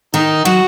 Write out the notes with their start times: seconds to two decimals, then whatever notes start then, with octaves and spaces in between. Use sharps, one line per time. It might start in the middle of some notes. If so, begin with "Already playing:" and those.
0.14 D#3 D#4
0.45 F#3 F#4